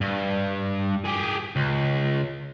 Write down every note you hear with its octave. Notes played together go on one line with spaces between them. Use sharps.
G2
G4 G#4
C#2